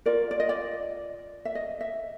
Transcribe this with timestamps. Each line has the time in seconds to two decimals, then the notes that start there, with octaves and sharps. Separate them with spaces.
0.06 F4 A#4 D5
0.31 D5
0.40 D#5
0.49 D5
1.45 E5
1.55 D#5
1.81 E5